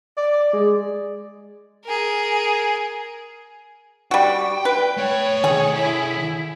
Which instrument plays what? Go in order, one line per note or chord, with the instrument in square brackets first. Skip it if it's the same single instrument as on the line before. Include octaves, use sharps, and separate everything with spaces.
[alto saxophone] D5
G#3
[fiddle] G#4 A#4
[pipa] G3 F#4 [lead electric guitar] G5
[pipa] B4
[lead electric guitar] A3 G5 [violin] C#5
[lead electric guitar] D#3 A4 [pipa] G#4
[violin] E4